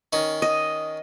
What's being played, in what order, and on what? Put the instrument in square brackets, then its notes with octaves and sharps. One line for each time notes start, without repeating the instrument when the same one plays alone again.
[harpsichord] D#3 C#4 D#4
[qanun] D#5